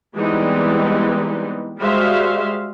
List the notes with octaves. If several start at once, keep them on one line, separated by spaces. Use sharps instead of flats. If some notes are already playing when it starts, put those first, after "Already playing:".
E3 G3 G#3 B3 C4 D#4
G3 G#3 F#4 C5 E5 F5